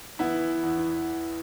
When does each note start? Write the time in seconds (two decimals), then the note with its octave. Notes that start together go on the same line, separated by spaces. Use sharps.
0.19 E3 B3 E4
0.34 E3
0.48 E3
0.63 E2
0.77 E3